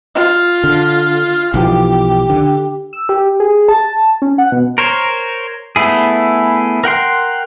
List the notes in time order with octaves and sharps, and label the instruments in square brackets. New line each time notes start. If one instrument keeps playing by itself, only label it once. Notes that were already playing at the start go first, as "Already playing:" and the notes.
[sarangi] F4
[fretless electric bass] D3
[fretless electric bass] B1 E3 F3 [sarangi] G4
[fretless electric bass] D3
[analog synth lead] E6
G4
G#4
A5
C#4
F#5
B2
[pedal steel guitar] A#4 C5 C#5
A3 B3 E4 G#4
A#4 F#5 G5 C6